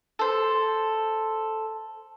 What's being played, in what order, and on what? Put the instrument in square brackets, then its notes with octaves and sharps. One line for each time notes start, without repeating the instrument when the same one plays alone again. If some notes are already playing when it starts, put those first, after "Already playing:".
[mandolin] A4 C5